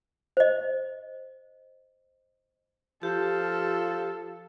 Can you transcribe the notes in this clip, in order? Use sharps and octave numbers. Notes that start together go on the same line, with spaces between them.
C5 D#5
F3 G4 A4